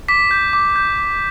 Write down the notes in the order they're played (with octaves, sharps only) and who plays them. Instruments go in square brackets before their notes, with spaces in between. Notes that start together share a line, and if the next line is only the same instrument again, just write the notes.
[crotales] D6 B6
G6
D6
G6
D6